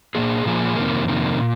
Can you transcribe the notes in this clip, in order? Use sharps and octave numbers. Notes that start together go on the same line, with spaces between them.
A#2 F3 A#3 G#4
A#2 F3 A#3 G#4
F2 C3 D#3 A#3
F2 C3 D#3 A#3
A#2